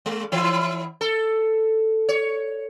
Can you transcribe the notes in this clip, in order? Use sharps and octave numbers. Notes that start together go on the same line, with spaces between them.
G#3
E3 E4
A4
C#5